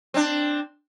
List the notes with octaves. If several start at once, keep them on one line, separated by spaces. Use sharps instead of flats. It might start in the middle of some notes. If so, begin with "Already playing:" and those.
C4 D4